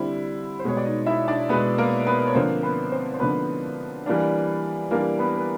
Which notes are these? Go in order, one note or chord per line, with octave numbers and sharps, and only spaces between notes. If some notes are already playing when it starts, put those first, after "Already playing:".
Already playing: D3 G3 C4 E4
C5
B2 G#3 B3 C#5
D5
D#4 D#5
E4 E5
D4 D5
B2 G#3 B3 B4
A#3 A#4
B3 B4
C#5
D3 F3 A#3 C4 C5
B3 B4
C4 C5
C5
D3 F3 A#3 B3 B4
E3 G3 A#3 D4
E3 G3 A#3 D4 A#4
B3 B4
B4